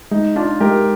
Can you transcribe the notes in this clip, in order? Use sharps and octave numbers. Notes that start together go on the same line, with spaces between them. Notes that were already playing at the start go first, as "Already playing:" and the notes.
G#3 D#4
D4 F4
G#3 G4 A#4